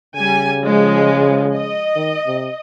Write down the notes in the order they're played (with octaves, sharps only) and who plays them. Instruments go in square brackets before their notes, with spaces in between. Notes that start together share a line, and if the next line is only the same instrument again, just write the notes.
[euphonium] C#3 [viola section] G3 G#5
[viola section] F3 G#3 G#4
D#5
[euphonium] D#3
C3